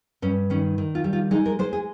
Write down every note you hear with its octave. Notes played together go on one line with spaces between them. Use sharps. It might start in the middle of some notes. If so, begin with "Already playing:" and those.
G2 C#4
D#3 C#4
D#3
F4
G3
F4
G#3 D#4
A#4
G#3 C5
G#4